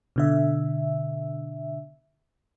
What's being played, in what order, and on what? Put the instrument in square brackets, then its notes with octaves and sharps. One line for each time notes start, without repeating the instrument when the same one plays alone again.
[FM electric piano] B2 D3 E5